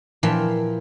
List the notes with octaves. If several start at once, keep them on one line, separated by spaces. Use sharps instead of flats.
A#2 E3 F3 G5